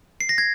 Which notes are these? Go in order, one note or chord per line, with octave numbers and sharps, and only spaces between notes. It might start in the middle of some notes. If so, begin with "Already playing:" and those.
C7
A#6
G#6